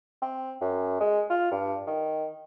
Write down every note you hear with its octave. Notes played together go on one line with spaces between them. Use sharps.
C4
F#2
G#3
F4
G2
D#3